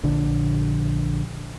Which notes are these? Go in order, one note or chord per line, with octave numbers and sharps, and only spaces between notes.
A#1 D3